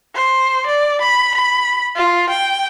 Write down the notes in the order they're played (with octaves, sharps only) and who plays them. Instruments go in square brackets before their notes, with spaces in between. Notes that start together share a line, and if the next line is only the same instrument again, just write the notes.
[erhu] C5
D5
B5
B5
F4
G5